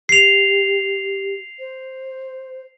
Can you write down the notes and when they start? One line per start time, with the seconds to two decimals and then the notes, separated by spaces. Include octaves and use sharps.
0.09 G4 C7 F7
1.59 C5